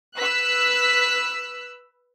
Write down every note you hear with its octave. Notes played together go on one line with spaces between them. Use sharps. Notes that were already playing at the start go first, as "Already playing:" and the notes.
B4 E6 F#6 B6